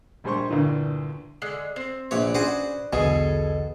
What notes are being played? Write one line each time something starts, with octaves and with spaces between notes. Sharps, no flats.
A#1 G3 G#3 C5 C6 C#6
D2 G2 A#2 E3
D3 G#3
C4
A#1 B4 C#5 D5
C#4 D4 F#4 G#4 C5
B1 E2 B2 D3 G#4 A4 G#5